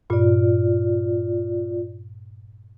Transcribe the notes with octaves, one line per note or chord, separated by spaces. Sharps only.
G2 A#2 F4 D5